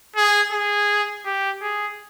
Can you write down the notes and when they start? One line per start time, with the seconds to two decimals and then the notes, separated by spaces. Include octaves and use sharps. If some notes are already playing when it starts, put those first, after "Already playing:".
0.16 G#4
0.52 G#4
1.25 G4
1.62 G#4